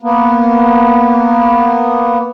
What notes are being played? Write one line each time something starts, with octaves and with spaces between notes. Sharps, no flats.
A#3 B3